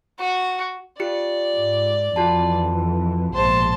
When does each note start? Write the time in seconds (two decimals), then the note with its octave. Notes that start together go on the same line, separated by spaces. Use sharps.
0.20 F#4
1.00 F4 G4 D5 C#7
1.52 G#2
2.16 F2 E3 F4 F#4 A5
3.33 A#1 G#2 B2 C5 A5